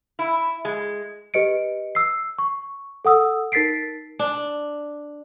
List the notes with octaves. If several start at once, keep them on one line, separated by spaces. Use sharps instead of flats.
E4
G#3
G4 B4 D#5 C#7 D7
E6 C7
C#6
A4 F#5 D#6 E6
D#4 A#4 A6 B6 C7 D7
D4